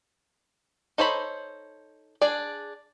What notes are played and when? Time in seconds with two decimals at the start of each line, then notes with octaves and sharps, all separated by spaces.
0.98 D#4 A4 C5 C#5 B5
2.21 D4 G#4 D5